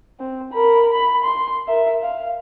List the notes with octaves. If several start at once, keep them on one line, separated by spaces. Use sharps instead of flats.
C4
A#4 B5
B5
C6
A#4 E5
F5